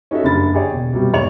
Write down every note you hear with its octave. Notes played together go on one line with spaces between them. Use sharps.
C#4 D#4 F#4 A4 E5
F#1 G2 D3 B5 A6
G4 G#4 C#5 D5
E1
C2 B2 F#3 G3
E2 G#2 C#5 D5 F7